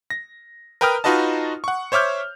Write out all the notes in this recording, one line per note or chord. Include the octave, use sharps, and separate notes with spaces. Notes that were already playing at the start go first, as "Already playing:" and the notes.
A#6
A#4 B4 G5 A#5 D#6 F6
D#4 F4 F#4 B4 D#5 A5
F#5 C#6
C5 C#5 E5 D6 F6 G6